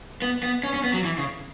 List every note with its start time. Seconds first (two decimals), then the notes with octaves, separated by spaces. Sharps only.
0.22 B3
0.43 B3
0.64 C#4
0.74 C#4
0.84 B3
0.94 F#3
1.05 E3
1.18 C#3